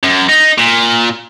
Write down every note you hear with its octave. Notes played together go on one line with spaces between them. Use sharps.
F#2
D#4
A#2